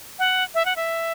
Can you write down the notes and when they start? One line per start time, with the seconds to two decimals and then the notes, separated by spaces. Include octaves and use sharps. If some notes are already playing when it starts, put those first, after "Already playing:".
0.19 F#5
0.55 E5
0.65 F#5
0.76 E5